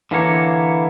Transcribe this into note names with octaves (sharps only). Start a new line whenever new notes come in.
D3 E3 A#3 C#5